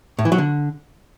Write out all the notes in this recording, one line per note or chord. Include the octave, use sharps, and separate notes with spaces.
A2
E3
F#3
D3